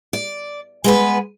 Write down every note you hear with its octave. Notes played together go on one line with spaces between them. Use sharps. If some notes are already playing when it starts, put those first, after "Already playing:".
D5
G#3 B3 B4